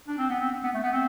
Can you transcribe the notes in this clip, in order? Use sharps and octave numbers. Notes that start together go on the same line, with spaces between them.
D4
C4
B3
C4
B3
A3
B3
C4